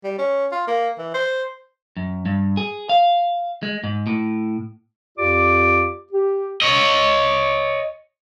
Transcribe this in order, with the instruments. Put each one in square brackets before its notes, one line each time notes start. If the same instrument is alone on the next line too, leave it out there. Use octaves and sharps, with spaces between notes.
[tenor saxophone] G3
C#4
F4
A#3
E3
C5
[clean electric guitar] F#2
G2
G#4
F5
G#3
G#2
A2
[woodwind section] F2 F4 G4 D5 D6
G4
[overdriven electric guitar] C#5 D#5